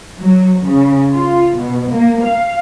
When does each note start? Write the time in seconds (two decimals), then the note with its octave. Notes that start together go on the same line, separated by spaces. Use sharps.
0.20 F#3
0.66 C#3
1.13 F4
1.55 B2
1.90 A#3
2.23 F5